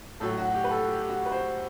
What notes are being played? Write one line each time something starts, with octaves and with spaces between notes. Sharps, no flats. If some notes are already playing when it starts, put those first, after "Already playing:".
A2 F#3 A4
F#4
G4
B4
A4
G4
G4
F#4
B4
C5